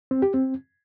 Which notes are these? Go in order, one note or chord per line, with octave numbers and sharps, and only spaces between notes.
C4
G4
C4